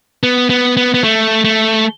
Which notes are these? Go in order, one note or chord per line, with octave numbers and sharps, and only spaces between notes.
B3
B3
B3
B3
A3
A3